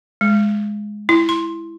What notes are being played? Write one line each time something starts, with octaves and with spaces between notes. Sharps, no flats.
G#3
E4
C6